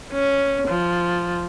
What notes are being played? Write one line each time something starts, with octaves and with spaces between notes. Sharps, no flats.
C#4
F3